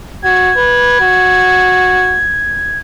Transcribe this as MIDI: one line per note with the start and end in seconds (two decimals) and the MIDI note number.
0.24 0.51 66
0.24 2.79 92
0.57 0.99 71
1.01 2.22 66